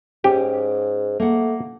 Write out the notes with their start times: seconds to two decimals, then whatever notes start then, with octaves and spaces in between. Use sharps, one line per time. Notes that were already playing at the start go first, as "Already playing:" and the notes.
0.24 G#2 C#4 G4
1.20 A3 A#3 F#5